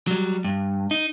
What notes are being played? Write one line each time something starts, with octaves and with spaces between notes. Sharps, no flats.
F#3 G3
G2
D#4